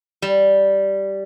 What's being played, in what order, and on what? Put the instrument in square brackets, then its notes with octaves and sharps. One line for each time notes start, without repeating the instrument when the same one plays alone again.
[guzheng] G3